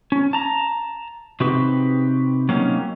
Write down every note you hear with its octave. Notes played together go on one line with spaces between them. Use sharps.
C#4
A5 A#5
C3 C4 D#4 F#4 G4 B4
F#3 A#3 C4 C#4 D#4